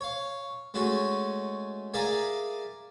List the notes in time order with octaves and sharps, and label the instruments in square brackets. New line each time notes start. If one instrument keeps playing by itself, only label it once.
[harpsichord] C#5 F5
G#3 A3 C#4 F#4 G#5
G#4 A#4 D5 E5 F5 G#5